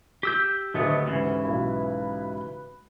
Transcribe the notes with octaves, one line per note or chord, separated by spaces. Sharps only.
G4 E6 G6
D2 F#3 A3 B3 D#5
G#2 C#3 E3 B4
B1 E4